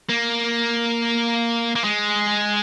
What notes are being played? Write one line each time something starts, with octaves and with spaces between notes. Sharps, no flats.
A#3
A#3
G#3